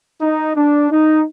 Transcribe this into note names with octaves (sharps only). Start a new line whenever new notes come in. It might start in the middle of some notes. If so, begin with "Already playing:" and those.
D#4
D4
D#4